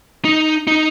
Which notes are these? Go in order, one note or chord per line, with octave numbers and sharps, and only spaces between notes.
D#4
D#4